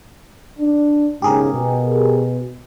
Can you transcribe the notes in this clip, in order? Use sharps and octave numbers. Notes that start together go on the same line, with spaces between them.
D4
B1 G#2 C#3 G4 G#4 A#4
B2